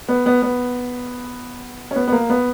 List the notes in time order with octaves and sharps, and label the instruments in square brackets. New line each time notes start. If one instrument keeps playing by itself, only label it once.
[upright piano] B3
B3
B3
C#4
B3
B3
A#3
B3